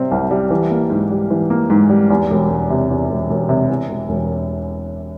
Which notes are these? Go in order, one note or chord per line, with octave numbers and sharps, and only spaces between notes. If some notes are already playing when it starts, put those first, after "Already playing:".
Already playing: C3 G3 C4
C2
G3
E3
A#3
G#2
G3
E3
A#3
G#2
G3
E2
E1
E1
C3
E2
E1
E1
C3
E2
E1
E1